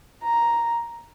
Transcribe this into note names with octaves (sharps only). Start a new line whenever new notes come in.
A#5